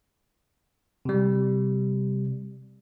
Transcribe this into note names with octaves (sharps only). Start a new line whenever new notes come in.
C3 G3